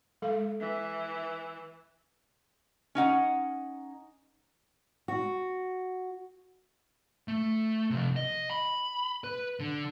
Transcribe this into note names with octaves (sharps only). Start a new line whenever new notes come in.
G#3 A4 F5
E3 E5
C#4 D#4 F#5
F#4
A3
C3 F3
D#5
B5
B4
D3